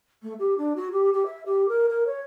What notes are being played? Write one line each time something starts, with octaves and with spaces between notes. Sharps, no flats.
A3
G4
D4
F#4
G4
G4
E5
G4
A#4
A#4
C#5